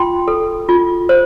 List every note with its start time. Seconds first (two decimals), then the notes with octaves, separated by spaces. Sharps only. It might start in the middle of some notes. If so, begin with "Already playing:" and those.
Already playing: F4 G5 C6
0.28 A4
0.69 F4
1.09 C5